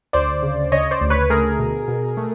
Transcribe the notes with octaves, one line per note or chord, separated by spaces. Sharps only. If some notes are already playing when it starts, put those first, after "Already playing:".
D2 C5 D5
C#3
C#3 C#5 D#5
C5 D5
D2
B4 C#5
A3 G#4 A#4
B2
B2
A3